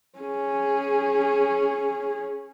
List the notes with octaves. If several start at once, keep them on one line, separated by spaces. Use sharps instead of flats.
C#4 G#4